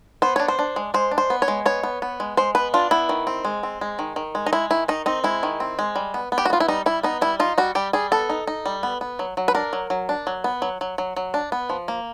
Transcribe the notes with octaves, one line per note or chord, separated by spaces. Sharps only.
B3 C5
D4 C#5
C5
D4
G#3
G#3 C5
D4
C5
B3
C#5
G#3
B3 C#5
B3
B3
G#3
G#3 C5
B3 B4
D4 F4
B3 E4
D#3
C4
G#3
C4
G#3
D#3
D#3
G#3
D#4
G#3 E4
D#3 E4
D#3 D#4
C4 D#4
G#3 E4
D#3
C4
G#3
G3
B3
B3
G4
F#4
B3 F4
E4
G3 D#4
G3 E4
B3 D#4
G3 E4
D#4 F4
G3 F#4
G3 G4
G3 G#4
B3 A4
D#4
D#4
G3
B3
B3
F#3
F#3
B4
D4 A#4
F#3
F#3
D4
F#3
B3
F#3
F#3
F#3
F#3
D4
B3
F3
A#3